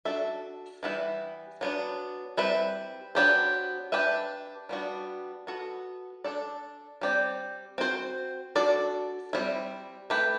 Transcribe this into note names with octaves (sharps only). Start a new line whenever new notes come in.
D4 F#4 A4 E5
E3 G3 B3 E4 B4
F#3 B3 D4
G3 C4 E4 B4
F#3 B3 D4 G4 C5
D4 G4 B4 E5
G3 B3 D4 F#4
B3 F#4 A4
D4 A4 D5
G3 C4 G4 D5
C4 F#4 C5
D4 F#4 A4 D5
G3 C4 E4
A3 E4 G4 B4